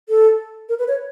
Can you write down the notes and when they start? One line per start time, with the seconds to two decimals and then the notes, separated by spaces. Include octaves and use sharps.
0.09 A4
0.69 A#4
0.79 B4
0.88 C#5